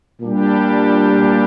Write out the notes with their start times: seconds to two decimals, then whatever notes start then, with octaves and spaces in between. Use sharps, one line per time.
0.21 A#2 G3 D4 G4
1.10 A#2